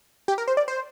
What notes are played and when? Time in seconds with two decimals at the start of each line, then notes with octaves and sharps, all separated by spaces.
0.28 G4
0.38 A#4
0.48 C5
0.57 D5
0.68 C5